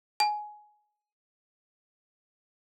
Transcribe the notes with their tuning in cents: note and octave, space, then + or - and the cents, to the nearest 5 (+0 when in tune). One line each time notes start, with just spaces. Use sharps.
G#5 +15